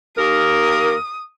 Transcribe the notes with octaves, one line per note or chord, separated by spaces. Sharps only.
D#2 A#3 A#4 D#6